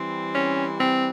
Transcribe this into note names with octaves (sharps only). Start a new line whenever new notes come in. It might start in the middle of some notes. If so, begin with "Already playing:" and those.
Already playing: E3 G3 C4
C#4
C4